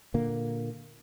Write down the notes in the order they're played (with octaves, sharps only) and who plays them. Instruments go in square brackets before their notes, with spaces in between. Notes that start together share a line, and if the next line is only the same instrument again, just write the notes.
[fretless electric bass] A#2 D3 A#3